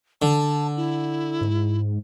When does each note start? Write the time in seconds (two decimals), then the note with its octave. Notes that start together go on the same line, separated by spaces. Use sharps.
0.22 D3 A5
0.77 E4
1.41 G#2